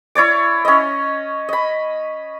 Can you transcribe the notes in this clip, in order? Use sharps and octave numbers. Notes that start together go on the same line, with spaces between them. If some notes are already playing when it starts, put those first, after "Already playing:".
E4 C#5 D5 D6
C#4 D#5
D#5 B5